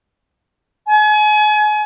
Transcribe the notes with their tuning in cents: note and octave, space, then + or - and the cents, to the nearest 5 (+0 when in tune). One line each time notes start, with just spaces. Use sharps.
G#5 +35